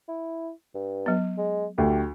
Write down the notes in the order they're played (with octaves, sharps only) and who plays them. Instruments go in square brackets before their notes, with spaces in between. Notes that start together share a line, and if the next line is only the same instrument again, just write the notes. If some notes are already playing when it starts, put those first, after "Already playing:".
[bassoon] E4
G2
[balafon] F#3 B3
[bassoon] G#3
[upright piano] D2 [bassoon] G4